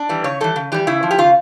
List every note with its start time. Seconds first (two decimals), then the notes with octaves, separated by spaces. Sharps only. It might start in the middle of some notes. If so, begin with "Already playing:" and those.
Already playing: D4
0.09 E3 G3
0.24 C#3 C#5
0.40 E3 G3 A4
0.56 C#3
0.72 E3 G3 G4
0.87 C#3 E4
1.03 F3
1.11 G4
1.18 C#3 F4